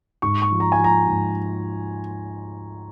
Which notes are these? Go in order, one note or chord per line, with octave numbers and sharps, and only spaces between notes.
G#2 C#6
C#6
F3
A#5
G#5
F3 A#5
G#2